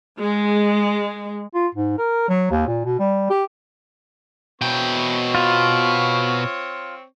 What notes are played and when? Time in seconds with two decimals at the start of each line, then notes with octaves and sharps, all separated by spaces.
0.19 G#3
1.54 F4
1.75 G#2
1.98 A#4
2.29 F#3
2.51 D#2
2.67 A#2
2.85 B2
2.99 G3
3.30 G4
4.62 B2 C4 C#5 G5 C#6
5.35 F4